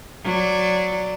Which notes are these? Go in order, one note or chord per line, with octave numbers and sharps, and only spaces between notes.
F#3 D5